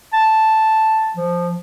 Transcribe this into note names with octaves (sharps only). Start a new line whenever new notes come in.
A5
F3